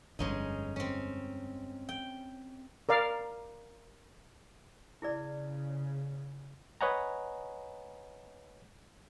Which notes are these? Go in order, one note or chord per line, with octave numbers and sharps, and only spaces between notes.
G1 F2 G#3 C#4 D#4
C4 C#4
G5
A#4 D5 F5
C#3 E4 G#4 D5
B4 C#5 D#5 F#5 G#5 A#5